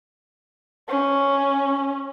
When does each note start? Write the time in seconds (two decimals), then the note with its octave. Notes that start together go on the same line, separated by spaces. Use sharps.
0.89 C#4